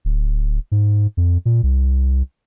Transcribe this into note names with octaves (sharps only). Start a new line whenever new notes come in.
D1
G#2
F2
A#2
C2